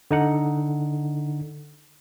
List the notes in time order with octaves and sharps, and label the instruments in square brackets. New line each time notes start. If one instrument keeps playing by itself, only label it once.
[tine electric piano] D3 D#4 F#5